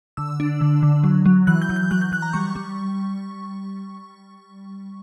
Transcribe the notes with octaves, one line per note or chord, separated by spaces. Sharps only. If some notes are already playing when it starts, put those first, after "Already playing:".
D3 E6
D4
D3
D3
F#3
F#3
E3 F#6
G6
E3
G6
F#3 F#6
G6
F#3 F#6
A#5
G3 C#6
G3